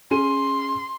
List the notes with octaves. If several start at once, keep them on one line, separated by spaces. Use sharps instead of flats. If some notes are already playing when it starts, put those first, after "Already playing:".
C#4 G#4 C6 D#7